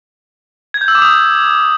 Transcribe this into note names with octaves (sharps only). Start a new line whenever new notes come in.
G#6
G6
E6
D6
D#6